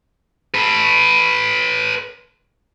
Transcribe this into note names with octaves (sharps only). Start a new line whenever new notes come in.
A4 B4